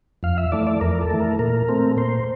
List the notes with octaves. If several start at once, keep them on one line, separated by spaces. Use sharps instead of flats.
F2 F5
E5
E3 A3 D5
D5
F2 A#4
A4
E3 A3
A#4
A#2 A#4
A3 C4
A#2 C5